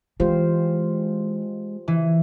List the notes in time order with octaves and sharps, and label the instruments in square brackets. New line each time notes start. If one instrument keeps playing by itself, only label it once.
[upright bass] E3 [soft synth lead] G#3 [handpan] F4 G4 C5
[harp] E3